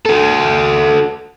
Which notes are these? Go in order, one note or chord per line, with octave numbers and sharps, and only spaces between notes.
F#4 A4